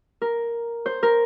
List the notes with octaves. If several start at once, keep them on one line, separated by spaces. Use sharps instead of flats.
A#4
C5
A#4